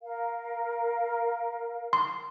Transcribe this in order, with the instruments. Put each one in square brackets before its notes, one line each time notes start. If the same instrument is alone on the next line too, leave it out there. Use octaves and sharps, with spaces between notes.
[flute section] A#4 F5
[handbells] C6